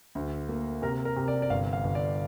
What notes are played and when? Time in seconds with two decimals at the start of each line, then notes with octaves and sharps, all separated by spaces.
0.15 D2
0.49 A#3
0.82 C3 A#4
1.05 A#4
1.16 C3
1.28 D5
1.42 D5
1.50 G1 F5
1.73 F5
1.84 G1
1.95 D5